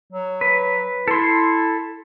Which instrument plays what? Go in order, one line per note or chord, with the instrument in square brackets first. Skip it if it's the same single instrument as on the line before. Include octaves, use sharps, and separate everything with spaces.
[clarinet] F#3
[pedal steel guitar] B4
[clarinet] E4 [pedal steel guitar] A4 C6